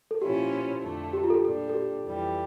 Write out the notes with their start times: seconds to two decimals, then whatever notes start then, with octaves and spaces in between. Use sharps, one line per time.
0.11 A4
0.22 A#2 F3 C#4 E4 G4
0.82 F2 D3 A3
1.13 G4
1.24 F4
1.30 A4
1.34 G4
1.44 A#2 G3 D4 A4
1.69 A4
1.74 G4
2.05 F2 E3 G3